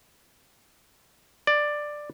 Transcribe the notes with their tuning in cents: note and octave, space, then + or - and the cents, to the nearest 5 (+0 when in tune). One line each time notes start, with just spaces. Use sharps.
D5 +10